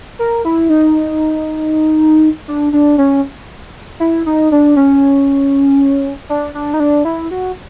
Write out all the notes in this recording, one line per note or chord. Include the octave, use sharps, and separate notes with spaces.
A#4
E4
D#4
D4
D4
C#4
E4
D#4
D4
C#4
D4
D4
D#4
D4
E4
F#4